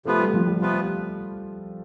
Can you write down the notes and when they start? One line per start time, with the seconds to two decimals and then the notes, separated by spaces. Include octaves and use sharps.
0.05 C3 F3 A3 B3 F4 B4
0.19 G3
0.34 F3
0.47 G3
0.61 C3 F3 B3 F4 B4